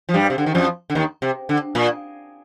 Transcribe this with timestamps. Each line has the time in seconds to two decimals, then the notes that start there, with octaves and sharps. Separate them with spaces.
0.09 F3
0.14 G2 G3
0.30 C3
0.38 D3
0.46 D#3
0.55 F2 F3
0.90 D3
0.95 D#2 D#3
1.22 C3
1.49 D3
1.75 A#2